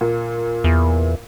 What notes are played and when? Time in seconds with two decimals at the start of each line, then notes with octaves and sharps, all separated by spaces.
0.01 A#2
0.64 E2